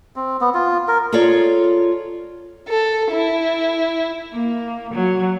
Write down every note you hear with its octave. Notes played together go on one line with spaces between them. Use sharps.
C4
B3
F4
A#4
F4 G#4 A4 C#5 D5
A4
E4
A#3
F#3